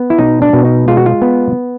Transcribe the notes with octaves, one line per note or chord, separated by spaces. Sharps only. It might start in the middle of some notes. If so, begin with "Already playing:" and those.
Already playing: B3
E4
B2 D#4
D4
B2
D#4
G#3 F4
F#4
F4
B3